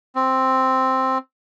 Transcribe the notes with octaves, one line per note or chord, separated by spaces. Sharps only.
C4